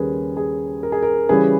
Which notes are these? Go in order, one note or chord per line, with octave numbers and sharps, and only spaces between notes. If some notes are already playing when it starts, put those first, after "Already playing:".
Already playing: D#2 C#3 G3 C#4 G#4 A#4 B4
G#4
A#4
G#4
A#4
C#3 E3 G3 C#4 G#4 B4